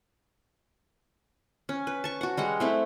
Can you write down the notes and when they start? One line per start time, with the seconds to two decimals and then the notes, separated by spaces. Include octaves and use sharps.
1.69 C#4
1.87 B4
2.04 A5 C#6
2.21 F#4 F#5
2.37 G3 G#3 F#5
2.60 A3 C4 E4